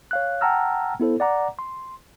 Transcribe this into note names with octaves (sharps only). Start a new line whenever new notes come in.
C#5 F5 F#6
F#5 G5 A5 A#5 E6 F6
B3 E4 A4 C5
D5 F#5 A#5 D6
C6